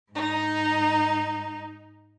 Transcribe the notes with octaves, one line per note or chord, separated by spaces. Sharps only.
G#2 D#4